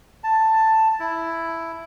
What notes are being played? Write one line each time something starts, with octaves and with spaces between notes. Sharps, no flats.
A5
E4